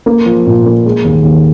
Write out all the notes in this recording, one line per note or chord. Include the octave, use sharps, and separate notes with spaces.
A#3
F3
A#2
A#3
G#3
D#2
D#2